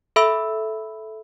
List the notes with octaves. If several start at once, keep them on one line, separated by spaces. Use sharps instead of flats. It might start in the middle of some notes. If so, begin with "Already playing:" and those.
A4 E5 B5 E6